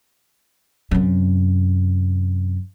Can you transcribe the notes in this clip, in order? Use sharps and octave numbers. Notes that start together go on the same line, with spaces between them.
F#2 C3